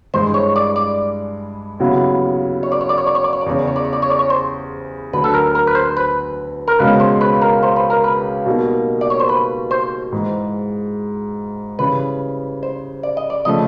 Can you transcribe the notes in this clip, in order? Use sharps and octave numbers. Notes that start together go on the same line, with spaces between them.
G2 E3 G#3 C5
C#5
D5
D5
D#2 C#3 F#3 B3 E4
C#5
D5
C#5
D5
C#5
D5
C#5
D5
C#5
D5
E2 C#3 E3 C#5
D5
C#5
D5
C#5
D5
C#5
D5
C#5
C5
D2 D3 F#3 B4
A4
A#4
A#4
B4
C5
B4
A#4
C#2 B2 G#3 C#4 B4
C5
B4
A#4
C5
B4
A#4
B4
B2 G3 A#3 D#4
D5
C#5
C5
B4
C5
G#2 E3 G#3
C#3 E3 G3 B4
C5
D5
D#5
D5
C#3 F3 A3 D#5